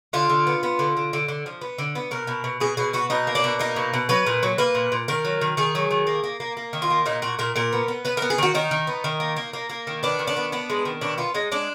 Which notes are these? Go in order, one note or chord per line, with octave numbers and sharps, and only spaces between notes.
D3 F4
D3
B3
B3
D3
D3
D3
D3
F3
B3
D3
B3
B2 A#4
B2
B2
B2 G#4
B2 G#4
B3 F#4
B2 D#4
A#3
D4
B2
A#3 D#4
B2
B2
F#3 B4
A#2
F#3
A#3 B4
A#2
A#2
D#3 A#4
F#3
D#3
D#3 G#4
F#3
D#3
A#3
A#3
A#3
A#3
D#3
F4
A#3
A#2 D#4
A#2 F#4
A#2 A#4
A#2 A#4
B3
B3
B3 B4
A#4
B3
G#4
D#3 F#4
D#3 D#4
D#3
B3
D#3
A#3
A#3
A#3
A#3
D#3
B3 D4
D#3
D4
B3
B3 D4
G#3
D#3
B2 D4
B3 F4
G#3 D#4
G#3 D4